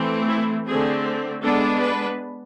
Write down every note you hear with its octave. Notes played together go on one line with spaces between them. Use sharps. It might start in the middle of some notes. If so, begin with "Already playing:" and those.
Already playing: E3 A3 C4
E4
D3 A3 C4 G#4
G#3 B3 D4 A4
B4